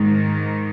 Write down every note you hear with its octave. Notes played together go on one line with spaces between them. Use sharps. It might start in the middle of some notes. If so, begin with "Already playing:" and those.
Already playing: G#2 D#3